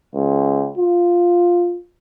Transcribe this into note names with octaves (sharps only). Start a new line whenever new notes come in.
C#2
F4